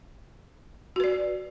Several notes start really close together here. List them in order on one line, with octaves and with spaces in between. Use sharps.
F#4 B4 D5